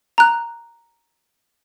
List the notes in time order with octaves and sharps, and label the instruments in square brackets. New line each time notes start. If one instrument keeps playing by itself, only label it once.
[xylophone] A#5 F#6